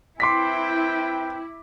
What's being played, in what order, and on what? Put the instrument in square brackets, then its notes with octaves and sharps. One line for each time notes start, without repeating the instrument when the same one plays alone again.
[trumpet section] C4 B4 G5 [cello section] E4 [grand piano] C6 D6 B6